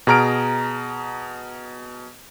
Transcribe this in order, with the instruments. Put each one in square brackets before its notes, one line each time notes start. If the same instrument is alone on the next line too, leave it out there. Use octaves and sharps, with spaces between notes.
[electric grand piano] B2 G#4 A#5 F6 D7